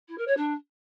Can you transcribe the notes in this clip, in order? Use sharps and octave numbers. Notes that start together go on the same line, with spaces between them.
E4
A#4
C#5
D4